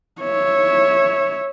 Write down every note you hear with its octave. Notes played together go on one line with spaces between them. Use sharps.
C#5 E5